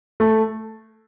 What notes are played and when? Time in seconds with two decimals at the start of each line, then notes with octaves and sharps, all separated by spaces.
0.20 A3